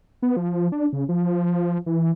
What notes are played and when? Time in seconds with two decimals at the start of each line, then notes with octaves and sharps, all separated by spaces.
0.22 B3
0.37 F3
0.72 D4
0.93 C#3
1.09 F3
1.86 E3